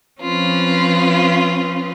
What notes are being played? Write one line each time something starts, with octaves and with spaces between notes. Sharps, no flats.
F3 C4 C#4 F4 B4